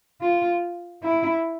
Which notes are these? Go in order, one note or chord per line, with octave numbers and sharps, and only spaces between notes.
F4
E4